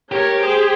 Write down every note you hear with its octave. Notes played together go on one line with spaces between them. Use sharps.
G4 A#4 C#5
G#4 C5